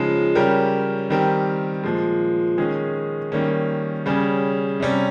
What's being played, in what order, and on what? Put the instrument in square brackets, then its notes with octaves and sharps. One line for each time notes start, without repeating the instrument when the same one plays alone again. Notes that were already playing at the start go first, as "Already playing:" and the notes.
Already playing: [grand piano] C#3 F3 G#3 D#4
C#3 G3 C#4 G4 A#4
D#3 G3 C4 G4 A#4
A#2 F3 G#3
D#3 G#3 C#4 G#4
D#3 G3 A#3 C#4
C#3 G3 C#4 G#4
C3 G3 C#4